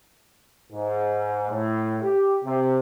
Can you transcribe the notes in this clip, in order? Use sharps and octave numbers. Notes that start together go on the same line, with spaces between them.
G#2
A2
G4
C3